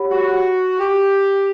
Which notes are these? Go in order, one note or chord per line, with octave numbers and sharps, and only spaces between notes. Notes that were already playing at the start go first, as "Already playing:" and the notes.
Already playing: G4 C#5 F#5 B5
F#4
G4